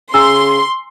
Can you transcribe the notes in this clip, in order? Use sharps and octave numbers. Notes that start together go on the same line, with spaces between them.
C#3 G#5 A#5 C6 E6